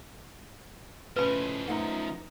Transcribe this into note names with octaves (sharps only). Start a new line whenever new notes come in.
A2 C#3 F3 B4 D#5 B5
F#2 A3 D#4 F#5